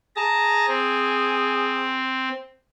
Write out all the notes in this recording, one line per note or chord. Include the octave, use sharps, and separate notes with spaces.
G#4 A5 A#5
C4